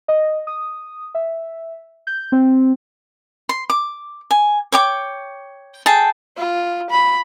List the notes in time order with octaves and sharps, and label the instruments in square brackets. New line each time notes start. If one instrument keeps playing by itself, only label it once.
[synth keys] D#5
D#6
E5
G6
C4
[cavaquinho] C6
D6
G#5
C#5 G5 D6
G#4 A4 G5 A5
[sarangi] F4
B5